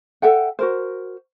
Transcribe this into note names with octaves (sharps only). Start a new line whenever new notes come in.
A4 E5 F#5 G5
F#4 A#4 C5